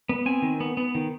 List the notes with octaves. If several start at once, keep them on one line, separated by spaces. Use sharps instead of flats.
B3
C4 G#5
D#3
B3
B3
D#3